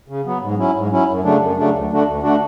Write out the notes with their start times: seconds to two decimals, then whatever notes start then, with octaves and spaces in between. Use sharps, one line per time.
0.08 C#3
0.25 F#3 B3
0.42 G#2
0.58 F#3 C#4 E4
0.75 G#2
0.91 F#3 C#4 E4
1.07 F#2
1.24 C#3 F#3 A3 D4
1.40 F#2
1.57 C#3 F#3 A3 D4
1.73 D2
1.90 D3 A3 D4 F#4
2.06 D2
2.22 D3 A3 D4 F#4